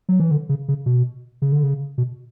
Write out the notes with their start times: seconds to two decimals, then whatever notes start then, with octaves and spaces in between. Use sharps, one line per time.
0.09 F#3
0.20 E3
0.31 D3
0.49 C#3
0.68 C#3
0.86 B2
1.42 C#3
1.52 D3
1.63 C#3
1.98 B2